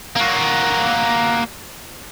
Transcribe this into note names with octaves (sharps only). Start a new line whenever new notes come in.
A#3 F#4